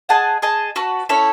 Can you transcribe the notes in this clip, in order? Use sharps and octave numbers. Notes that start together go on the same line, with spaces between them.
G#4 D#5 F#5 A5
G#4 D#5 A5
F#4 B4 F#5 A5
C#4 E4 A4 C#5